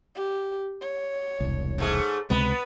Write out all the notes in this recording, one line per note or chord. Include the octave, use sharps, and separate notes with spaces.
G4
C#5
E1 C2
G#2 A3 G#4
C#2 C3 G#3 B3 B4